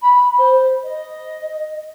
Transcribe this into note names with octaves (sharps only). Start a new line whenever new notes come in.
B5
C5
D#5